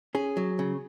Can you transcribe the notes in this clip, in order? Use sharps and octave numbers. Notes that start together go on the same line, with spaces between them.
C#4 G#4
F#3
C#3